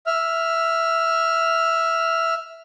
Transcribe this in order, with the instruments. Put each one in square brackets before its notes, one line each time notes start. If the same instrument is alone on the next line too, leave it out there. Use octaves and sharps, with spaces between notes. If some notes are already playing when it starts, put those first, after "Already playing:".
[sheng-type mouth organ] E5 F6